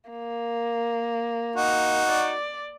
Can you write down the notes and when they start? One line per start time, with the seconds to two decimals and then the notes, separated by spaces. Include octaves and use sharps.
0.10 A#3
1.56 D#4 F#4
2.06 D5